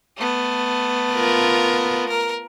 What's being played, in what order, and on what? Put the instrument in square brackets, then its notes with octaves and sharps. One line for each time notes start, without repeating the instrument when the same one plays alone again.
[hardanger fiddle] A3 B3
[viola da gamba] F4 A#4
[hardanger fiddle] A#4